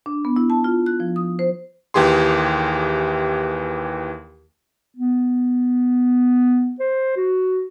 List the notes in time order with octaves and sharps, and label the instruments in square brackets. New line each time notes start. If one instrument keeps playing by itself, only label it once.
[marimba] D4
B3
E4
A5
F4
F#6
F3
D#6
C5
[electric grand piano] D#2 E3 G4 G#4 C6
[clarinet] B3
C5
F#4